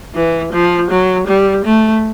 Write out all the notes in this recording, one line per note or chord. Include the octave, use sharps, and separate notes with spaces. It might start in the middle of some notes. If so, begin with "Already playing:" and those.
E3
F3
F#3
G3
A3